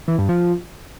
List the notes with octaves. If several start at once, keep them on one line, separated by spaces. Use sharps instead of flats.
E3
G2
F3